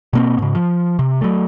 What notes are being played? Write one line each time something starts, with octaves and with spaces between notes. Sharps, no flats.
B2 A#3 C4
G#2 C#3
F3
C3
F#3 A3